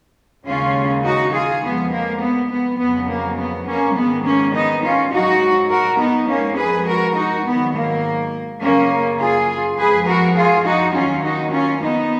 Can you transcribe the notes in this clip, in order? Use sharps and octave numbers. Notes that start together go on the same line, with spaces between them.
D#2 C#3 G#3 C#4 F4
D#4 F#4
F4 G#4
F2 F3 G#3 B3
A#3
B3
B3
F2 C#3 F#3 B3
A#3
B3
A#3 C#4
G#2 D#3 G#3 B3
A#3 C#4
B3 D#4
C#4 F4
G#2 F#3 D#4 F#4
F#4 A#4
B3 D#4
F2 F3 G#3 A#3 C#4
G#4 B4
F#4 A#4
D#4 F#4
G#2 D#3 F#3 B3
A#3
F#2 C#3 F#3 A#3 C#4
F4 G#4
F2 F3 G#3 G#4 B4
F#4 A#4
F4 G#4
D#4 F#4
D#2 D#3 F#3 C#4 F4
D#4 F#4
C#4 F4
B3 D#4